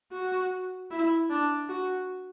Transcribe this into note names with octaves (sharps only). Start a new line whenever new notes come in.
F#4
E4
D4
F#4